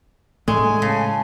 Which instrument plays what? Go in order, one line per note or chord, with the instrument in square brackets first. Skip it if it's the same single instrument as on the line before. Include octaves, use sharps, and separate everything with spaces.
[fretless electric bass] A2 A3 [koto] G#3 [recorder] G#5
[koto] C#3 [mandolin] A5